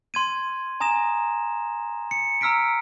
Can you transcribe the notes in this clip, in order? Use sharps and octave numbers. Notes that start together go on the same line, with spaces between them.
C6 G#6 D#7
G#5 A#5 D#6 A#6 E7
C#7
A#5 E6 F6 B6 D7